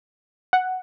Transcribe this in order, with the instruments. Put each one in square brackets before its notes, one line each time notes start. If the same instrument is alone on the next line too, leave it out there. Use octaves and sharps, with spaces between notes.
[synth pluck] F#5